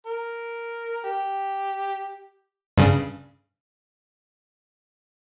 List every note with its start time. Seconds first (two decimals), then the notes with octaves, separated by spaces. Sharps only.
0.06 A#4
1.04 G4
2.78 G2 C#3